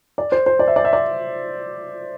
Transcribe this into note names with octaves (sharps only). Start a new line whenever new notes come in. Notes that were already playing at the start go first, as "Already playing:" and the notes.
D5
C5
C5
D5
E5
D5
E5
D5